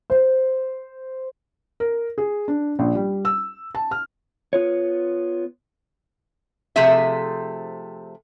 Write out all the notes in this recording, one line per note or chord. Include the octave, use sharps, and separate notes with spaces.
C5
A#4
G#4
D4
A#1
G3
E6
A5
F6
B3 F4 C#5
C3 F3 A3 C4 G#4 E5